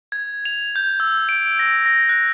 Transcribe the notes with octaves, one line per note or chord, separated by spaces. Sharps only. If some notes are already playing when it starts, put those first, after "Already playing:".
G#6
F7
G6
E6
D7
A#6
A#6
F#6